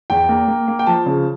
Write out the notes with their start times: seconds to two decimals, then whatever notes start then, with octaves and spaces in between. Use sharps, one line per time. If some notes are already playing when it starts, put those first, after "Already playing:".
0.10 E2 G5
0.29 A#3
0.48 A#3
0.68 A#3
0.79 G5
0.86 F3 A5
1.06 C#3